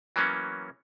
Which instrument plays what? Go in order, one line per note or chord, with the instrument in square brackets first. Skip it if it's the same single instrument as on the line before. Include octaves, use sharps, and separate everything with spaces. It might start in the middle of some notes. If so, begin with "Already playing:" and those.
[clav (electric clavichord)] E3 F#3 A#3 B3 C#4